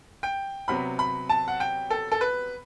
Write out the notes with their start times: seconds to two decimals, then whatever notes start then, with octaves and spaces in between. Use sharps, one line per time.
0.23 G5
0.68 C3 F#3 B3 B5
0.99 B5
1.29 A5
1.48 F#5
1.60 G5
1.90 A4
2.12 A4
2.21 B4